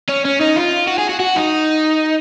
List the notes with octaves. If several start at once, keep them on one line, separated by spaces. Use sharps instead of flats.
C#4
C#4
D#4
F4
F#4
G#4
F#4
F#4
D#4